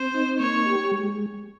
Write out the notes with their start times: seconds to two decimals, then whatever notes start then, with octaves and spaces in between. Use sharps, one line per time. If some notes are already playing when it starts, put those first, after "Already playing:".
Already playing: C4 C5
0.14 D#4
0.40 A#3 C#5
0.66 G4
0.92 G#3